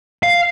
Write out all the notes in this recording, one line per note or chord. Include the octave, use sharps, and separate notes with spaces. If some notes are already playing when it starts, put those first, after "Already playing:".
F5